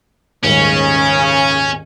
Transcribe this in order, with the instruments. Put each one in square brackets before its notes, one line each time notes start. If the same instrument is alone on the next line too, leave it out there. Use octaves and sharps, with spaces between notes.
[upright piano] D#1 G#2 [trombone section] D#2 C#3 [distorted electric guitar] C#4